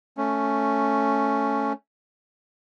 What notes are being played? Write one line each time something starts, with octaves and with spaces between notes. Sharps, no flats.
A3 C#4